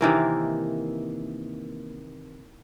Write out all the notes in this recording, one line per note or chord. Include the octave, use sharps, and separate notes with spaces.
C3 D#3 E3 A#3